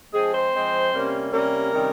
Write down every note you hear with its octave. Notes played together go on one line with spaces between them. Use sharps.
F3 G#3 C4 G#4
C5
F3 G#3 C4
C3 G3 A#3 C#4
C3 G3 A#3 C#4 A#4
C3 D#3 G3 C#4